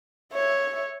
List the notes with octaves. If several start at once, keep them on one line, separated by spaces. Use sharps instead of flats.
C#5 E5